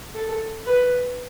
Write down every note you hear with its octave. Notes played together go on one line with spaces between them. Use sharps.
A4
B4